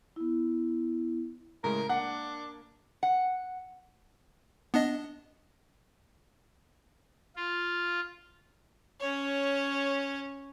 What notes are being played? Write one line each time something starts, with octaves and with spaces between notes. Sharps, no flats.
B3 E4
A2 C#3 G#3 A#4
A#3 D4 F#5
F#5
B3 D4 D#5
F4
C#4 C#5